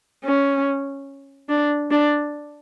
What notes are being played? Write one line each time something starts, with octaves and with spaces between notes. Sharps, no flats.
C#4
D4
D4